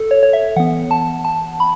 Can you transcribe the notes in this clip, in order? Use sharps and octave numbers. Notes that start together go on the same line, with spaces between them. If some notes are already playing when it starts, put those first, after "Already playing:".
Already playing: A4
C#5
C#5
E5
E3 B3 F#5
A5
A5
B5